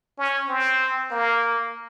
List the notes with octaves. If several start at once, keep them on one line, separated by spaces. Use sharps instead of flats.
C#4
C4
A#3